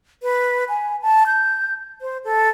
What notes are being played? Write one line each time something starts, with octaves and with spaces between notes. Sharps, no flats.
B4
G#5
A5
G6
C5
A4